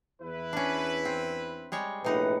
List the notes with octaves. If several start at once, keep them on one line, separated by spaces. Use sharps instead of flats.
E2 E4 B4
C#4 D4
C4
G3 G#3 C#5
A#1 A2 C3 D#4 B4 F#5